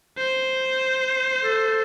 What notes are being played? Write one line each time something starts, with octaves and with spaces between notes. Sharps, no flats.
C5
A4